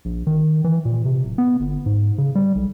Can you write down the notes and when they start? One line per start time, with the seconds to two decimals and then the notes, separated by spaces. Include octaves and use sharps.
0.05 A#1
0.27 D#3
0.64 E3
0.85 A#2
1.05 C3
1.25 D1
1.38 B3
1.60 G1
1.86 G#2
2.18 C#3
2.35 G3
2.55 B1